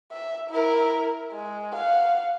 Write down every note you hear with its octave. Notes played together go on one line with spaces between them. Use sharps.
E5
E4 A#4
G#3
F5 F#5